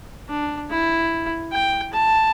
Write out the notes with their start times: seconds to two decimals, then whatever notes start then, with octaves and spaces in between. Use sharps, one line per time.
0.29 D4
0.71 E4
1.53 G5
1.93 A5